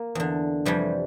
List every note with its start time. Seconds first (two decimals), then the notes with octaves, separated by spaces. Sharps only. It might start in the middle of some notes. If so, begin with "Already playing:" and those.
Already playing: A#3
0.15 E2 D3
0.65 F2 C3 E3 G3